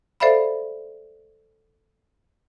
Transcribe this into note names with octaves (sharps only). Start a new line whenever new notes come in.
A4 C5 D5 E5 F5 B5